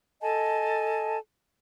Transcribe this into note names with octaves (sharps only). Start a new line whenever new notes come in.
A4 D#5 G#5 A5